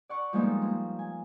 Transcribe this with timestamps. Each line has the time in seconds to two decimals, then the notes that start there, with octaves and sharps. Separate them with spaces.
0.09 D5 F#5 C#6
0.33 F3 G3 G#3 A#3 B3 D#4
0.62 A#3
0.99 G#5